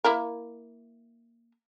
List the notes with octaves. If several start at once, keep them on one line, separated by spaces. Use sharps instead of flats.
A#3 E4 A#4